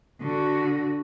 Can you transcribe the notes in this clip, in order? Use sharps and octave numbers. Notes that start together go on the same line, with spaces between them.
D3 F#4